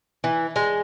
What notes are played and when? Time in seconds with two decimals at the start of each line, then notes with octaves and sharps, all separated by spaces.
0.24 E3
0.56 G#3